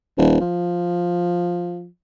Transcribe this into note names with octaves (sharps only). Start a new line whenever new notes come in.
D#1
F3